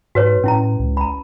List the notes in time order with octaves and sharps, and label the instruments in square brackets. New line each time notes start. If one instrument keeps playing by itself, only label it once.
[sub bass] G#2 [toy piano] F#4 B4 C#5
[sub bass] A2 [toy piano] C#4 E4 A#5
[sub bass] C#2
[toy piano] A#5 B5